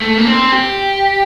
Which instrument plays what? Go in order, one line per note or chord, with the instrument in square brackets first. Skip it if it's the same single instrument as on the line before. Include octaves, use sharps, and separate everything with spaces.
[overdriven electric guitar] A3
A#3
C4
G4